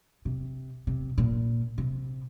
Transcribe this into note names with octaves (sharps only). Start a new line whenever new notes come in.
C3
C3
A#2
C3